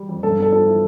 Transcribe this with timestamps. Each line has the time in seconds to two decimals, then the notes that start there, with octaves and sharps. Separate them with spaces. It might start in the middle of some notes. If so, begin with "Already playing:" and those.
Already playing: G3
0.09 F2
0.23 G2 A4
0.38 B3 A4
0.52 F3 A4
0.67 E4